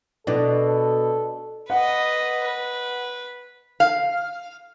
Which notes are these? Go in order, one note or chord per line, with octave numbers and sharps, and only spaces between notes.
B2 D4 A4 D5
B4 D#5 F#5
B4
F5